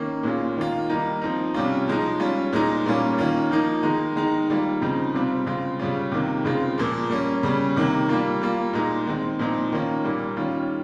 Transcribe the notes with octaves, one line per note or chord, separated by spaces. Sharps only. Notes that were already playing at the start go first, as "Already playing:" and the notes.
Already playing: D#3 A#3 C#4
A#2 G#3 C#4 F4
D#3 A#3 F4
D#3 G3 A#3 D#4
F3 C4 D#4
C3 G3 C#4 F4
F3 G#3 D#4
G3 C#4 F4
A#2 G#3 D#4
A#2 G3 A#3 C#4 F4
D#3 A#3 C#4 F4
F3 A#3 D#4
D#3 G#3 D#4
D#3 G#3 D#4
D#3 G3 A#3 F4
C#3 F3 C4 D#4
C3 G3 C4 F4
C#3 G#3 C4 F4
C#3 G3 C#4 F4
C3 D#3 A#3 F4
C#3 G#3 C4 F4
A#2 F3 A#3
G3 A#3 C#4
C#3 G3 C#4
C3 D#3 A#3
G3 A#3 F4
G3 A#3 F4
A#2 G#3 D#4
D#3 G#3 C4
A#2 F3 C4 D#4
D#3 A#3 C#4 F4
A#2 G3 A#3
D#3 G3 C#4 F4